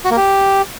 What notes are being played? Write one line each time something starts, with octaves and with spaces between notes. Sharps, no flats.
F#4
A#3
G4